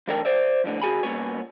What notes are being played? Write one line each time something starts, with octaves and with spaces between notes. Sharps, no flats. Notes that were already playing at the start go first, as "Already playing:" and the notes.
B1 E2 A3 D4 A#4 G5
C5 D5 E5
F2 A2 D3 B3
C#3 F#4 G#4 G#5 B5
G2 A#2 B3 C#4 C#5